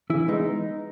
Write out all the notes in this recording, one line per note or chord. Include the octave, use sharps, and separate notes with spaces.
E3 E4
G#3 B3 D#4